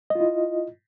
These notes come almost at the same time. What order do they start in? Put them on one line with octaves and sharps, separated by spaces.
D#5 F4 E4